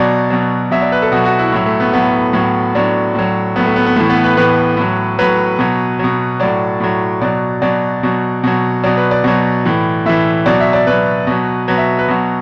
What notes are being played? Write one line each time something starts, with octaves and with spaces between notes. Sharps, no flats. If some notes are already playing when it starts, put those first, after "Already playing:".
Already playing: B2 F#3 D5
B2 F#3
B2 F#3 E5
D5
B4
A4
B2 F#3 F#4
F#4
E4
A2 F#3 E4
A3
B3
A2 F#3 B3
A2 F#3
A2 F#3 D4
A2 F#3
A2 F#3 B3
A3
B3
B3
A2 E3 A3
B3
B4
A2 E3 B4
A2 F#3
A2 F#3 B4
B2 F#3
B2 F#3
A2 F#3 D5
A2 F#3
B2 F#3 D5
B2 F#3 D5
B2 F#3
B2 F#3
B2 F#3 D5
B4
D5
B2 F#3
A2 E3
A2 E3 E5
B2 F#3 D5
E5
D5
B2 F#3 B4
B2 F#3
B2 F#3 B4
E5
B4
B2 F#3